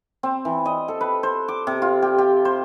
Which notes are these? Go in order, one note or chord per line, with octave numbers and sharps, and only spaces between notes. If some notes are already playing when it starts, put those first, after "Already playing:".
C4
E3
D#5
A4
B4
C5
D6
C3
F4
G4
G4
C5